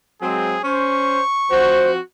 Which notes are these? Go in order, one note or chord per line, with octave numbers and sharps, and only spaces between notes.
F#3 G#3 C4 G#4
C#4 C5 C#6
F3 C4 F#4 C5